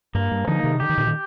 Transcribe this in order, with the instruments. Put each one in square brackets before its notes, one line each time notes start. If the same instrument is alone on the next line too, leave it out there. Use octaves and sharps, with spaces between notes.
[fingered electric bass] G2 [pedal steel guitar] A#3
[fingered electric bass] G2
[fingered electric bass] D3 F3 [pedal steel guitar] D#4
[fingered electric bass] C3 D#3
[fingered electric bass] D3 [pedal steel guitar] G4
[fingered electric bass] D#3
A#2 D3
D#3